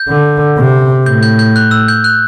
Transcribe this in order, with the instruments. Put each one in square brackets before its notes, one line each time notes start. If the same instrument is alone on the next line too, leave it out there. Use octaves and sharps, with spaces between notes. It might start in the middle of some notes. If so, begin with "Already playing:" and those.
Already playing: [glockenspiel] G6
[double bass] D3
C3
[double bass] A2 [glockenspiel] G6
[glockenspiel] G6
G6
F#6
E6
G6
F#6